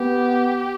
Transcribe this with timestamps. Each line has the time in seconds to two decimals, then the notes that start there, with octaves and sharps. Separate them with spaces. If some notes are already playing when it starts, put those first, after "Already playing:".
Already playing: B3 G4